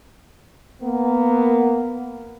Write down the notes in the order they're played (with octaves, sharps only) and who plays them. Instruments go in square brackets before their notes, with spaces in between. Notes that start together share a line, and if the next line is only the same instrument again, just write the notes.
[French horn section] A#3 B3